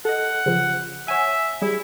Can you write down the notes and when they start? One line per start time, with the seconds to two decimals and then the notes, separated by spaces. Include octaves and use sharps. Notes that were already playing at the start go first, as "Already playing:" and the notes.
0.05 A4 D#5 F#5
0.46 C#3 F3
1.08 C#5 E5 F#5 G#5
1.62 G3 E4 G#4